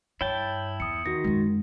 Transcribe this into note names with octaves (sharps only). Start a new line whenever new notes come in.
G2 E4 C#5 G5 A5
E2 D#6 C#7
D#3 F#4 A#6
F#2 G#3